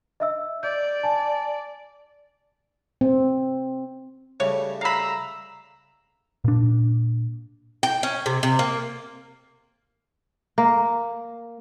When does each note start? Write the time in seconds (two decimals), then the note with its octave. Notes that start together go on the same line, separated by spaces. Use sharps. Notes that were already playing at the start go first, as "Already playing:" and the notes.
0.20 D#5 E5 E6
0.63 D5 G6
1.03 G#5 A5
3.01 C4
4.40 C#3 G3 A3 C#5
4.81 F5 A#5 B5 E6
6.44 A#2 D4
7.83 G5
8.03 C#4
8.26 C3
8.43 C3
8.59 A#3
10.58 A#3